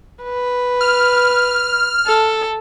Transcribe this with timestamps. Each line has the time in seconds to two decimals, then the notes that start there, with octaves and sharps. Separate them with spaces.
0.23 B4
0.81 F6
2.07 A4